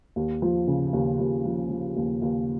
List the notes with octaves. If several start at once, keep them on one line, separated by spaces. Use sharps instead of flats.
D#2
F3
C#3
D#2
D#2
F3
F3
D#2
D#2